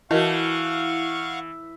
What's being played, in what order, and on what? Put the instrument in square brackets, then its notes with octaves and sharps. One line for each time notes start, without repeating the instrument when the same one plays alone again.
[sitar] E3 [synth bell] E4 [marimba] F#4 A#4 D#5 [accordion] F5 F#5 C#6